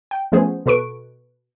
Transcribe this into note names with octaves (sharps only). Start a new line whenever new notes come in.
G5
F3 A3 B3 C#4 G#4 C5
B2 A4 B4 C#6 D7